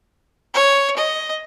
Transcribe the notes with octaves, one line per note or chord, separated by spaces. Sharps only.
C#5
D#5